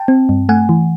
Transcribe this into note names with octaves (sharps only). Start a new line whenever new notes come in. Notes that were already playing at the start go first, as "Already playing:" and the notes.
Already playing: G5 A5
C4
G2
A3 F#5 G#5
E3